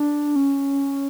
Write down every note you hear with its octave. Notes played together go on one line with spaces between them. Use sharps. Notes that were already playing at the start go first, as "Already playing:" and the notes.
Already playing: D4
C#4